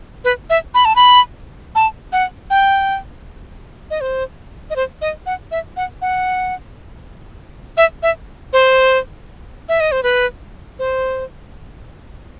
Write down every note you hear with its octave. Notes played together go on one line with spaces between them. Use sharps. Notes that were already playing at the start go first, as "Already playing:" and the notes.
B4
E5
B5
A5
B5
A5
F#5
G5
D#5
C5
D#5
C5
D#5
F#5
E5
F#5
F#5
E5
E5
C5
E5
D#5
C5
B4
C5